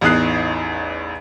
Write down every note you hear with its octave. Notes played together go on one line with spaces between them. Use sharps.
A1 E2 D#4 D#6 F#6 C7